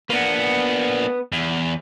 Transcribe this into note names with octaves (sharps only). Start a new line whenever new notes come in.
A#3 B3 D4 B4
E2